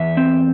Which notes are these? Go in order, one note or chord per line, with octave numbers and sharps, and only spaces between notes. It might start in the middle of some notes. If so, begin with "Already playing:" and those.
Already playing: E2 E5
C4